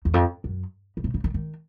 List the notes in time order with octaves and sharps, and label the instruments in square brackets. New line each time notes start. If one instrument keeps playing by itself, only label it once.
[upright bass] E2
F2
F#2
C#3
C3
C#3
D#3
D#3